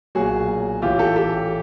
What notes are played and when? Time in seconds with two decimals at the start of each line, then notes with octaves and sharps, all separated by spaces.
0.15 B1 A#2 F#3 F#4 G#4
0.82 A1 A2 E3 F4 G4
0.99 G4 A4
1.16 G4 A4